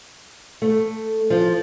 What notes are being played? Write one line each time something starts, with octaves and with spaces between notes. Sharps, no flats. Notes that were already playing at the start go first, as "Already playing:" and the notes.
A3
F3